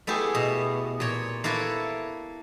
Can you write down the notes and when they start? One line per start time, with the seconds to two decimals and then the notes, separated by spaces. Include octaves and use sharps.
0.07 A3 B3 E4 G4 G#4
0.35 B2
1.00 A#2 C#5
1.44 A#3 E4 A4 B4 C#5